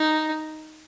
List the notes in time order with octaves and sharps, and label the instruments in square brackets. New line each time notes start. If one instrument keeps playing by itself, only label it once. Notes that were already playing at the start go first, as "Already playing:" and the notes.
Already playing: [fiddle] D#4